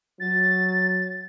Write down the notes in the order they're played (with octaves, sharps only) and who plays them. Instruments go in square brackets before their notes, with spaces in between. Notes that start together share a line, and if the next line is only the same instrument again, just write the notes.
[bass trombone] F#3 [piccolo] A6